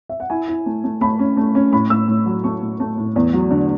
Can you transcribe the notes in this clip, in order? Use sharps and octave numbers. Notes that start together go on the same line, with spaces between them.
E5
F#5
E4 G#5
E4
A3
A3
A3 B5
C#4
A3
C#4
A2 B5
A2 E6
A2
F#3
A3 C#6
A2
A3
A2
E2
F#3
D3